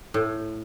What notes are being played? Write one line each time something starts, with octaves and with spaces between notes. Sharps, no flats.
A2